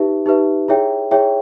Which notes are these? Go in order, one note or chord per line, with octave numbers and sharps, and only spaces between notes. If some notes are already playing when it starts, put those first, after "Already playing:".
Already playing: D#4 G4 B4 E5
D#4 G4 B4 E5
E4 G#4 C#5 E5 G5
E4 G#4 C#5 E5 G5